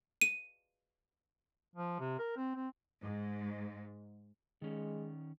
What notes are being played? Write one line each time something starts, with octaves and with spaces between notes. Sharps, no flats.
D#7
F3
C3
A#4
C4
C4
G#2
D#3 G#3 C#4